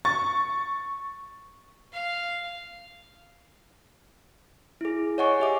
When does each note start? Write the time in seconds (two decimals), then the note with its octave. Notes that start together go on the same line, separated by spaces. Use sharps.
0.05 C#6 A6
1.92 F5
4.81 E4 G#4
5.18 C#5 D#5 F#5 G#5 C#6
5.40 G4 E5 D6